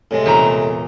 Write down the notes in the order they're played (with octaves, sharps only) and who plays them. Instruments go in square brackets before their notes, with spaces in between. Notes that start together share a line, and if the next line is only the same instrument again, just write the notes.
[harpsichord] A2 C3 G#3
[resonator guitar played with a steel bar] E2 A#2 A#5